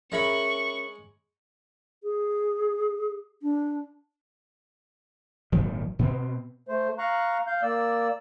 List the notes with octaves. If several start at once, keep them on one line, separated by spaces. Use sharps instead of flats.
G#3 C#4 A#4 E5 B5 C#6
G#4
D4
D#1 G#1 D#3 F#3
B2 B3 C4
A3 C5
F5 A#5 C#6 F#6
F5 G6
A#3 D5 E6